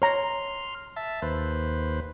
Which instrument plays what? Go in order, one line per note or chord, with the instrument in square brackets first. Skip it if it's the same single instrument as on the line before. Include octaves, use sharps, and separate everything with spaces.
[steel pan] C#5 A#5 [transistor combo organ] C6 F6
[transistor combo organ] E5 A5
D#2 B4 C5